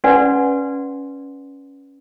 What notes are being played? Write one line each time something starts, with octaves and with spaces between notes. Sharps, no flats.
C#4 B4 D5 F#5 G#5 C6